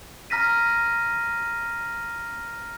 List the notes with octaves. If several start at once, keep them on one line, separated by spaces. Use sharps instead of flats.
A#5 F6 A#6 B6 D#7